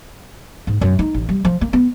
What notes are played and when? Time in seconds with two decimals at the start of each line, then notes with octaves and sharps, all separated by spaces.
0.67 G#2
0.81 F#2
0.99 D#4
1.14 A1
1.29 G3
1.45 F3
1.61 A#3
1.73 B3